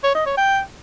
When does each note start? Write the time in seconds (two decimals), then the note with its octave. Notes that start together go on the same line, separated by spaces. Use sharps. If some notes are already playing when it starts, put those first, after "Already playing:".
0.04 C#5
0.15 D#5
0.26 C#5
0.37 G5